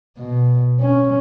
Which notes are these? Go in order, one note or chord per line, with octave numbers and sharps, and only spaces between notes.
B2
C#4